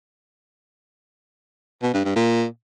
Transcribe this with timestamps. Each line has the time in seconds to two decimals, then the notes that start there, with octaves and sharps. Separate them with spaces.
1.82 B2
1.93 G2
2.05 G2
2.16 A#2